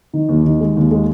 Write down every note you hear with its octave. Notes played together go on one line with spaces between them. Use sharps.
D#3
D#2
D#3
G#3
D#2
G#3